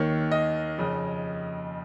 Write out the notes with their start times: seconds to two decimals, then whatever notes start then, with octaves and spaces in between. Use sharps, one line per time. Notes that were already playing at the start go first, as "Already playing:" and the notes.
Already playing: D#2 D#3 C#5
0.31 D#5
0.78 F2 C#3